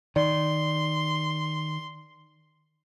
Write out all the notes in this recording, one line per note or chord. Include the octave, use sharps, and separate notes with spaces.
D#3 D5 C6